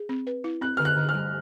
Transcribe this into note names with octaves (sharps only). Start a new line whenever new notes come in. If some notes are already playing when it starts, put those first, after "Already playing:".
Already playing: G#4
C4
B4
E4
C4 F#6
D3 F6
F#6
D3
G3 F6